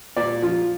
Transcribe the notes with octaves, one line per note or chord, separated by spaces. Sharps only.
A#2 D5
F3 F4